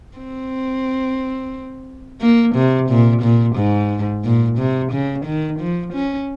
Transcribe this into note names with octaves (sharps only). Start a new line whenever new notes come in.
C4
A#3
C3
A#2
A#2
G#2
A#2
C3
C#3
D#3
F3
C#4